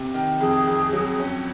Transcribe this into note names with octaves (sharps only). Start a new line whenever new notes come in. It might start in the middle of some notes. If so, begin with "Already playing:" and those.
Already playing: C3
D#3
F2 G#4
F2
F#3
C#4